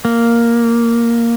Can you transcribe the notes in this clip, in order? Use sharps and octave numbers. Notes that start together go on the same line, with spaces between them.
A#3